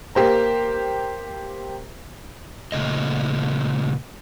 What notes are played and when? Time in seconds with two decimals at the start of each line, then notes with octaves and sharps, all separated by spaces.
0.15 A#3 G4 C5 A#5
2.72 A#2 C#3 A3 D#5